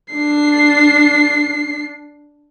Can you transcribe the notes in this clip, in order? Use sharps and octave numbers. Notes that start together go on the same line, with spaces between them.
D4 C7